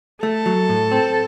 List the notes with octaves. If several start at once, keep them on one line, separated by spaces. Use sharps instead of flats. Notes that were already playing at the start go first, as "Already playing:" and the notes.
A3 A4
F#3
A2
C4